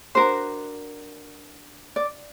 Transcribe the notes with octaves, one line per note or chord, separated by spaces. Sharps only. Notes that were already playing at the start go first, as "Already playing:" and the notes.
D4 F#4 A#4 C5
D5